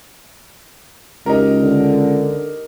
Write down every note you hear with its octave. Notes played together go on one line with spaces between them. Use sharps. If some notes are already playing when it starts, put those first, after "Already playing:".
C#2 D#4 G4 A#4
D3